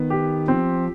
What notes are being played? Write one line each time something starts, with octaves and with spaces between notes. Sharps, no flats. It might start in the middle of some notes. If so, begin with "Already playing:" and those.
Already playing: D#3 B3
G4
F3 C4